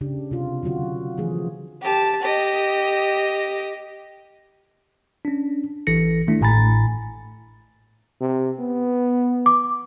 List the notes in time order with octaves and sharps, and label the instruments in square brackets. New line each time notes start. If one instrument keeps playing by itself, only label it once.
[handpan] C#3 D4 G4
C3 F4
D3 F#3 F4 F#4
D3 E3 F3 A3 G#4
[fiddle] G4 A5
G4 D#5
[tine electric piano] C#4 D4
A1 E3 A4 A#6 C#7
D#3 A3 D4 E4
A1 A2 G#5 A#5 B5 A6
[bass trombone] C3
B3
[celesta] D6